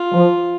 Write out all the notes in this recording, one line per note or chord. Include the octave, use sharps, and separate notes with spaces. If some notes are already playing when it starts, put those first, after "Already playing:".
Already playing: F4
F3